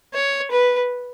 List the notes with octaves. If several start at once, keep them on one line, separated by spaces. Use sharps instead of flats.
C#5
B4